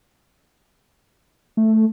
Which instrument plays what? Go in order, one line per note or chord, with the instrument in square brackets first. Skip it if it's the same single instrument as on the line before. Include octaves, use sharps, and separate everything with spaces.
[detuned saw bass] A3